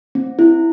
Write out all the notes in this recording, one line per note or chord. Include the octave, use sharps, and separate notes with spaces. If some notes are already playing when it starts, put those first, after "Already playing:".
C4
E4